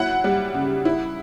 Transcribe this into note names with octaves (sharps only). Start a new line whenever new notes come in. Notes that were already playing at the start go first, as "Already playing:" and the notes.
Already playing: F#3 E4 F#5
G3
C#3
E4